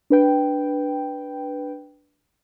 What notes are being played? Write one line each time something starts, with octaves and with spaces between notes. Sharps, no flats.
D4 B4 G5